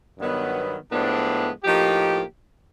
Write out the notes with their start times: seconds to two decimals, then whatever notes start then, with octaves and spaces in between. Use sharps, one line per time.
0.19 G2 D#3 F#3 B3
0.92 A2 F3 G#3 B3 D4
1.64 A2 F3 A#3 D#4 G4